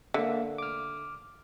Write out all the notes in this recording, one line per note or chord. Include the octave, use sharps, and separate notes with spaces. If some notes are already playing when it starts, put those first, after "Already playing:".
D3 A#3 E5
D6 F6